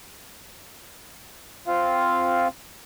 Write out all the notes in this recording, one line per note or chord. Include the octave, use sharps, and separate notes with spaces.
C4 F4 F5